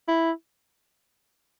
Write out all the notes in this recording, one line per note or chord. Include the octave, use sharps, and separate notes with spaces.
E4